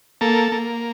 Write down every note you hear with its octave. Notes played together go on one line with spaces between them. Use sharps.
A#3 A4
A#3